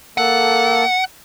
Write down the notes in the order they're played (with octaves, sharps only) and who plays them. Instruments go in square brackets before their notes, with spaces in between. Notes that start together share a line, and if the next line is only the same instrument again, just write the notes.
[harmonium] A#3 A4 [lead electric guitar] F#5